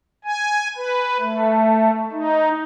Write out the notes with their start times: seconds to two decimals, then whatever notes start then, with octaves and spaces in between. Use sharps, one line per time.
0.25 G#5
0.76 B4
1.20 A3
2.12 D#4